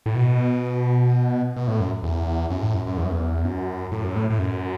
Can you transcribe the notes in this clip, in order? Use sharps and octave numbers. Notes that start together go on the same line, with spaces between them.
A2
B2
B2
A2
F#2
E2
F#2
A2
F#2
F#2
E2
F#2
E2
F#2
A2
F#2
A2
A2
F#2